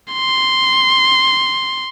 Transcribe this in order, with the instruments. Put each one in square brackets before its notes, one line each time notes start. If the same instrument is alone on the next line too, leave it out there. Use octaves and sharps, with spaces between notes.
[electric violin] C6